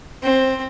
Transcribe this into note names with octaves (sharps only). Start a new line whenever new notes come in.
C4